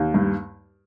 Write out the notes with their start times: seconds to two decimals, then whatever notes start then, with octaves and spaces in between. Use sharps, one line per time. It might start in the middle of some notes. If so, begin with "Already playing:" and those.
Already playing: D#2
0.14 G2